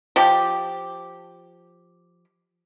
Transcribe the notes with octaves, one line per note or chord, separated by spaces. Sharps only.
F3 G4